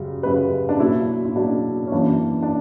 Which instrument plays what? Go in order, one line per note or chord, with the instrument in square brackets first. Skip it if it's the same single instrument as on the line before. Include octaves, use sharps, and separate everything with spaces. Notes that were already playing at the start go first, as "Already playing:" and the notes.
Already playing: [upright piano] F#2 C#3 G3
F#2 C#3 G3 B4
D4
B2 F#3 A#3 E4
E4
B2 F#3 A#3 D4
C#4
F#2 E3 A#3 D4
D4